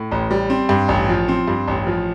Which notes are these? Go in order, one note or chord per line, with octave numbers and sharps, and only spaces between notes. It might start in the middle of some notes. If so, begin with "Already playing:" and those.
Already playing: A2
A1
G3
C4
G2
A1
F3
C4
G2
A1
F3